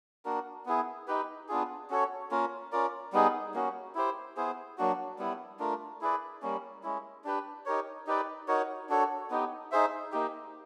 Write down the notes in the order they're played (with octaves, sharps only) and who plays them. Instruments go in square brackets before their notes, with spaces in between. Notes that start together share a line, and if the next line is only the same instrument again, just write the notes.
[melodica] A#3 D4 F#4 A#4
B3 E4 G#4
D#4 G4 B4
B3 D4 F4 G#4
C#4 F#4 A4 C#5
A#3 C#4 F4 A#4
C#4 F4 A#4 D5
G3 B3 D#4 G#4
A#3 C#4 F#4
E4 G4 C5
B3 E4 G#4 C5
F#3 A#3 D4 F#4
G3 B3 E4
A3 D4 F4 A#4
E4 G#4 B4 D5
G3 A#3 C#4
G#3 C#4 E4
D4 G4 B4
D#4 G4 A#4 C#5
D#4 G4 B4 D5
D#4 F#4 A#4 C#5
D4 F#4 A4 C#5
B3 D#4 G4
D#4 G#4 C5 E5
A#3 D#4 G4